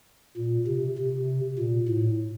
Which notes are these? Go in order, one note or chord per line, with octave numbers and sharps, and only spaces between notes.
A#2
C3
C3
A#2
A2